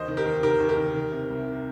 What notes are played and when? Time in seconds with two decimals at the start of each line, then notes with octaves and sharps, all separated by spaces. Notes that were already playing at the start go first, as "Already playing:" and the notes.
Already playing: D#2 C5 D#5
0.08 D#3
0.17 G4 A#4
0.26 D#2
0.43 D#3 G4 A#4
0.60 D#2
0.69 G4 A#4
0.78 D#3
0.95 D#3
1.12 C3
1.30 C2